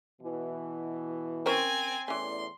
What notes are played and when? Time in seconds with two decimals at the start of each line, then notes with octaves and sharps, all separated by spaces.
0.21 B2 E3
1.46 C4 C#4 A#4 C5 G#5
2.08 E2 A2 E3 C#4 D5 C6